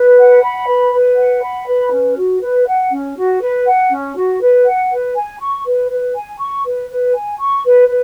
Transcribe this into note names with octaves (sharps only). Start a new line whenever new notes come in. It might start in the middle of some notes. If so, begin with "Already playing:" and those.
Already playing: B4
F#5
B5
B4
B4
F#5
B5
B4
C#4
F#4
B4
F#5
C#4
F#4
B4
F#5
C#4
F#4
B4
F#5
B4
G#5
C#6
B4
B4
G#5
C#6
B4
B4
G#5
C#6
B4
B4